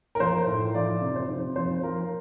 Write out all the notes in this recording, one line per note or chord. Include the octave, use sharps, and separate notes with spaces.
A#4
F3 C5
A2
F3 D5
C3
C5
C3
F3 C5
F3 A#4